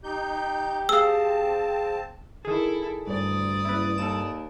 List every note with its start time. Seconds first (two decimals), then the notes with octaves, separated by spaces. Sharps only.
0.04 D#4 G4 G6
0.89 C4 G#4 F5 A5 E6
2.45 D#3 E4 G#4 A4
3.07 D2 G2 D5 D#6
3.65 F#1 E4 B4
3.98 D#2 A4 E7